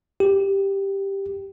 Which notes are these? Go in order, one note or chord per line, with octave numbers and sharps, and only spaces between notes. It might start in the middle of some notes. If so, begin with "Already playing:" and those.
G4